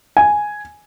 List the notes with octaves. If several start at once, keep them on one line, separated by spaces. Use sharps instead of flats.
G#5